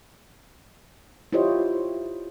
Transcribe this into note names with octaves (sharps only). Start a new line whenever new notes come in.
E4 F4 G4 C5 C#5 D#5